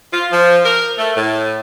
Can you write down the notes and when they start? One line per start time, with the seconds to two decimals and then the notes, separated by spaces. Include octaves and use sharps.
0.13 F4
0.32 F3
0.65 A#4
0.98 A3
1.16 A2